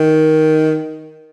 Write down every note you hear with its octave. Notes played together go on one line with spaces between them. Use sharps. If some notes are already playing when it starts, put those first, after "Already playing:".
Already playing: D#3